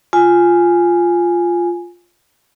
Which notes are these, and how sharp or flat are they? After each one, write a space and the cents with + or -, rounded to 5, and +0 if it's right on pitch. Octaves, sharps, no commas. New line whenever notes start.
F4 +0 G#5 +0